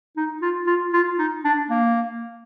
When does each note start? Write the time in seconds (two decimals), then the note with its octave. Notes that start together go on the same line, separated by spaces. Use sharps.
0.17 D#4
0.42 F4
0.67 F4
0.93 F4
1.19 D#4
1.44 D4
1.70 A#3